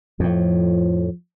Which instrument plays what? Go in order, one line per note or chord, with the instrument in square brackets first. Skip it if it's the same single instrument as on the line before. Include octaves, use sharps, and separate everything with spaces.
[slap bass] F2 A2 [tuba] F3